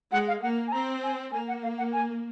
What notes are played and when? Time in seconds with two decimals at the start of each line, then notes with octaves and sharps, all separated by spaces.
0.12 G#3 F#5
0.28 F5
0.42 A#3 F#5
0.68 G#5
0.72 C4 A#5
1.03 G#5
1.32 A#3 G#5
1.48 F#5
1.63 F5
1.78 F#5
1.93 G#5